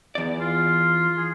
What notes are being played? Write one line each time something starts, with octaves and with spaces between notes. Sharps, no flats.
E2 D5
F4
G#4